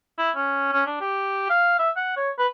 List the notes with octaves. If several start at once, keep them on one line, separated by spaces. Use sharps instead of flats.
E4
C#4
C#4
D4
G4
F5
E5
F#5
C#5
B4